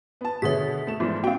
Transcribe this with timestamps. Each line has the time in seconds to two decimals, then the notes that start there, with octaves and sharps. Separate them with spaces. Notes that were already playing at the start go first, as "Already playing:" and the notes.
0.21 B3 A5
0.42 B2 D3 G#4 B4 C#5 E5 B6
0.87 A3 E7
1.00 G#2 E3 F3 A3 B3
1.24 B3 C#4 F#4 F5 G5